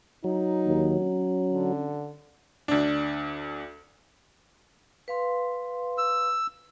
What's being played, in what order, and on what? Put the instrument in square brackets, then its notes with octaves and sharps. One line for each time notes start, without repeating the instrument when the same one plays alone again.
[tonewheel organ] F#3 [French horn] D#4
[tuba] D#2
C#4
[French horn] D3
[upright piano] D2 D4
[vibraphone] B4 F5 C6
[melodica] E6